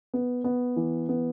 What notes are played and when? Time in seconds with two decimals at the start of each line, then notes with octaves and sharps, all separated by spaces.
0.14 B3
0.44 B3
0.76 E3
1.09 B3